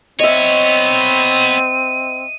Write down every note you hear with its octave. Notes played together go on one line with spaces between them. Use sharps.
B3 C4 C#5 D#5 E5 D#7